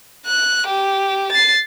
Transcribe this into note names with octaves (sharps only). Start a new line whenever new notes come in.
F#6
G4
A6 C7